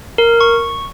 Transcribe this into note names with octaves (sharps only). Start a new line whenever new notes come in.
A#4
C#6